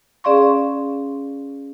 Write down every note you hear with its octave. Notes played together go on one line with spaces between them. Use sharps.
C#4 G#4 D5 F5 C6 C#6